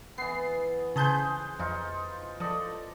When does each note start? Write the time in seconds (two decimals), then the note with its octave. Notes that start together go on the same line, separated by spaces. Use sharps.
0.18 E3 B3 C7
0.96 C#3 G#4 B4 C5 A5 G6
1.59 F2 D#4 F4
2.40 F3 A4 D5 D#5